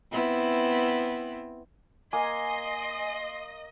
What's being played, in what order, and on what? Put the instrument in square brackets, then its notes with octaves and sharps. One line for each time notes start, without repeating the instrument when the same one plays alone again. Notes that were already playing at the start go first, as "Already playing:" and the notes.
[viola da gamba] B3 C4 E4
[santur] A#3 [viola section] D#5 [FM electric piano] G#5 [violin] C6